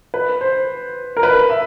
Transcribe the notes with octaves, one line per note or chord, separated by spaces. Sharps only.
B4
C5
A#4
B4
E5